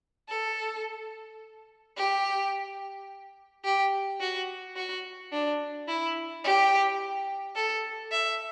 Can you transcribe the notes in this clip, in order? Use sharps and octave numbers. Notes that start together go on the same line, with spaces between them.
A4
G4
G4
F#4
F#4
D4
E4
G4
A4
E5